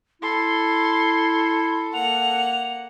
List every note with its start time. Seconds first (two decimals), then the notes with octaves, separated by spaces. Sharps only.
0.22 E4 A4 C6
1.94 A#3 F#5 F7